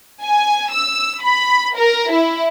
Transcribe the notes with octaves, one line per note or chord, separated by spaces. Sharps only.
G#5
E6
B5
A#4
E4